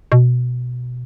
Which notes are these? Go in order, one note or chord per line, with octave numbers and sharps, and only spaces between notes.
B2